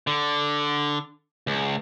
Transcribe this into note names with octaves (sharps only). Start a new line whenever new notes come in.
D3
C#2